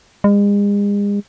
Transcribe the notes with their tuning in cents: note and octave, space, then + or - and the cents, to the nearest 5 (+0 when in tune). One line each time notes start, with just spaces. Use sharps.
G#3 -40